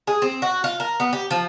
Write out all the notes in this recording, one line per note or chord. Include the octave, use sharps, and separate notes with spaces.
G#4
C4
F#4
F4
A#4
B3
G4
F3